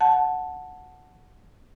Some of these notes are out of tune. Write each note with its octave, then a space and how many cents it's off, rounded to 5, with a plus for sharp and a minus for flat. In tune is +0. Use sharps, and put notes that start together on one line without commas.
F#5 -5 A5 +0